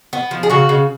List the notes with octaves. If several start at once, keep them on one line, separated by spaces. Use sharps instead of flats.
B3
F3
G#4
C#3 F#4
C#3